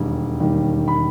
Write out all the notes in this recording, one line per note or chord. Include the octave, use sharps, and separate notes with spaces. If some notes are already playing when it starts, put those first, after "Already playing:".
Already playing: E1 D#2 D#3 G3
E1 D#2 D#3 G3
B5